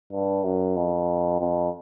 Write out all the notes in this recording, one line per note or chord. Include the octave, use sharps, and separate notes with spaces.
G2
F#2
F2
F2